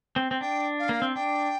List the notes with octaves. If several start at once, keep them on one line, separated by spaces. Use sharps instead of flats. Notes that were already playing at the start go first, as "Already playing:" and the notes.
C4
C4
D4 G5
F5
A#3
C4
D4 G5